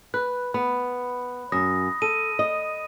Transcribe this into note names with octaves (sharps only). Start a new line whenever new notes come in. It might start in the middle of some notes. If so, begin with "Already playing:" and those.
B4 F#6
B3 B5
F#2 D#6 A#6
A4 D#7
D#5